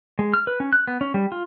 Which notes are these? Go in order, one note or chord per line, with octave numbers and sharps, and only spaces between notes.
G#3
F6
B4
C#4
F#6
B3
C#4
G3
F4